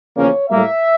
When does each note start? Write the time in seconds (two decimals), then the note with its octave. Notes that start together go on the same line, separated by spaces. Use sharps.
0.16 E2 C#3 F3 A#3 C#4 C#5
0.49 A2 G3 A#3 E5